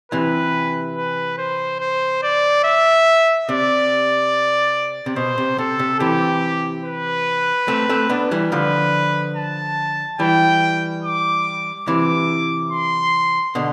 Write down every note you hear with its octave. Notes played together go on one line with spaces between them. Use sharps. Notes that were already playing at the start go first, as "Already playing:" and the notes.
C3 E3 B4
B4
C5
C5
D5
E5
C3 D5
C3
B2 C5
C3
C3 A4
C3
C3 E3 G4
B4
A3 C4
A3 C4
B3 D4
E3 G3
D3 F3 B4
A5
E3 G3 G5
D6
C3 E3 D6
C6
B2 D3